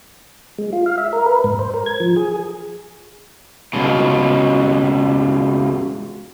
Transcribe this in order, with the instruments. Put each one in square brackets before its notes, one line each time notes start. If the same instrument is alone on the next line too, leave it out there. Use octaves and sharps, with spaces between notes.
[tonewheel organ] G#3
F4
F5
E5
A#4
B4
G#2
C5
A#4
G#6
F3
G#4
[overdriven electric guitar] C#2 B2